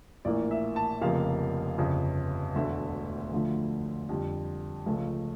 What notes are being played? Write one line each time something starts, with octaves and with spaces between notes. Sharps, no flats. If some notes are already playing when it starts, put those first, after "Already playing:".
A#1 A2 E3 A#3 D5
E5
A5
F1 F2 C#3 F3 A#3 F5
G1 F2 C#3
E1 D2 D3 A3 E5
D2 D3 F3 A3
F2 D3 G3
C#2 C#3 F3 A3